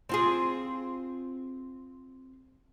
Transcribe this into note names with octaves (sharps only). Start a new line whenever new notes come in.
C4 F4 G#4